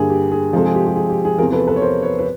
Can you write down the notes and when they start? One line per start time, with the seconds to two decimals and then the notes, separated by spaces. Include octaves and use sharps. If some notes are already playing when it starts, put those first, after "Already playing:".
Already playing: G2 D3 G3 A#3 G#4
0.10 G4
0.32 G#4
0.53 C3 F3 G#3 A4
0.65 G#4
0.75 G4
0.86 G4
0.96 G#4
1.10 G4
1.25 G#4
1.38 E2 C3 F3 G#4 A#4
1.52 A4 B4
1.68 A4 B4
1.76 C#5
1.81 A#4 C5
2.03 B4 C#5
2.19 B4